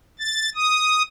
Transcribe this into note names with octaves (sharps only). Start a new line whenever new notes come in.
A6
D#6